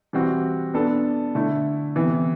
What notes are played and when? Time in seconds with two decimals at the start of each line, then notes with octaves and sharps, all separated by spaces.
0.13 E3 G3 C4 F#4
0.74 B3 D4 A4
1.35 D3 A3 E4
1.95 C3 E3 B3